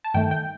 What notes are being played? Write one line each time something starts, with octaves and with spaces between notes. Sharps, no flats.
A5
G2 D#3 A3 G5
G5